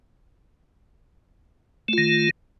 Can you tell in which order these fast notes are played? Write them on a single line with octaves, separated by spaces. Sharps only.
A3 F4 D#3